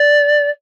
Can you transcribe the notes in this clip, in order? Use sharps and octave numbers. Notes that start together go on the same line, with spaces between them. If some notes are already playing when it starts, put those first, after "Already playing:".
Already playing: D5